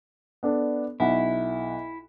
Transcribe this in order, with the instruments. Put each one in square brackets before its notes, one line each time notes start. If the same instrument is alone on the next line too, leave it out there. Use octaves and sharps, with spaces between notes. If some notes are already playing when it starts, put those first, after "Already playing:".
[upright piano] B3 D4 A4
[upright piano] B1 F#5 [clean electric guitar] E4